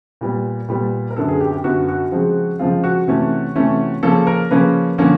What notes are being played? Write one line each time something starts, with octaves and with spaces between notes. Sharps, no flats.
A#2 G3 B3
A#2 G3 B3
A#4
F#2 D3 F#3 B3 A4
G#4
G4
G4
F#2 D3 F#3 B3 F#4
F#4
C#3 F3 G#3 C4
C#3 F3 G#3 C4 F4
F#4
C3 E3 A3 C#4
C3 E3 A3 C#4
C#3 F3 A#3 C#4 A4
A#4
C#3 F3 A#3 C#4 B4
D3 F3 A#3 C#4